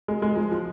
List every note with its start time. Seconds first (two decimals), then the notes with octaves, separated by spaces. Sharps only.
0.08 G#3
0.22 G#3
0.36 F3
0.51 F3